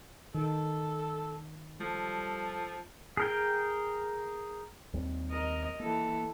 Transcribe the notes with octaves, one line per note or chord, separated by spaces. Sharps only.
D#3 A4
F3 G3 A4
G#4 A#4 G5
D#2 G3 C4
A#4 D#5
E3 A#3 A4